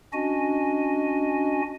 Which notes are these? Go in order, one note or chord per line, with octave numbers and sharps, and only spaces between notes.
C#4 D4 F#4 D#5 G#5